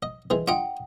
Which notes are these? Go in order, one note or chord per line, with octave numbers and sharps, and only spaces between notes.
D#5
D#3 E3 G#3
D4 F4 D#5 F#5 G5